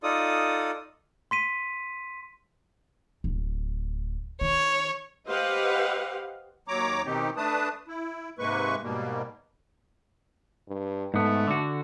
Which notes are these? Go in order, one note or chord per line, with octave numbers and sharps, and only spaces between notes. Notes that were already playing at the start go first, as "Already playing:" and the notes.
D#4 F4 A4 D5 D#6
C6 B6 D#7
D1
D#3 C#5
G4 B4 C5 D#5 F5 F#5
D#2 F#3 C#5 A#5 D6
B2 D#3 C4 D#4 G4
A3 D4 B4 A5 D#6
E4
G#2 C3 G#3 A#3 B4 C#6
G#2 B2 G3 A#3
G2
G#2 A3 B3
D3 F#4